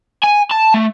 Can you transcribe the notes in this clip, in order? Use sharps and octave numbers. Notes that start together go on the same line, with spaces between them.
G#5
A5
A3